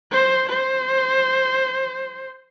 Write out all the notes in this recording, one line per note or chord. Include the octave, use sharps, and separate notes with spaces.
C5
C5